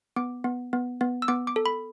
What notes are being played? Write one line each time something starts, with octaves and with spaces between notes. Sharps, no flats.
B3 D6
B3
B3
B3
E6
B3 D6
D6
A4
B5